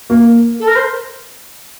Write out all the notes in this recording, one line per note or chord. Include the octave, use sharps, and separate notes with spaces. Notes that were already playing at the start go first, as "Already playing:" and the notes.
A#3
A4
A#4
C5